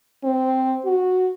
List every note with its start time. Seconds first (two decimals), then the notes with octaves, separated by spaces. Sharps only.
0.24 C4
0.85 F#4